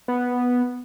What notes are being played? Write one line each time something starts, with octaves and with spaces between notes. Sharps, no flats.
B3